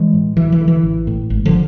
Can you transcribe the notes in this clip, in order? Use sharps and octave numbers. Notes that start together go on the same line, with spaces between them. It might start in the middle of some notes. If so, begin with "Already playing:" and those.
Already playing: E3 G#3
A2
D2 E3
E3
D3
E3
A1
A2
G#1
D3 F3